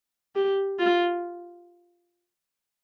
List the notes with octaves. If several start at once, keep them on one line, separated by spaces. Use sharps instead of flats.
G4
F4